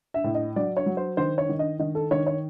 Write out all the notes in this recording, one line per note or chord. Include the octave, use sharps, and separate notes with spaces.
E5
A2
D#5
F#3 D5
C#5
F#3
C5
D#3 C5
C#5
D#3
D#5
D#3 D#5
A4
D#3 C#5
C#5